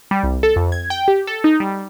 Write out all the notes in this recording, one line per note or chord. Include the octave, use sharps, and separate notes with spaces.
G3
C2
A4
F2
G#6
G5
G4
A4
D#4
G3